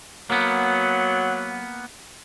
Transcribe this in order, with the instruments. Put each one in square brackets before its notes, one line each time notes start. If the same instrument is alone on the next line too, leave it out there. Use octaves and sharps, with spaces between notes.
[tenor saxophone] F#3 [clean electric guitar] A#3 B3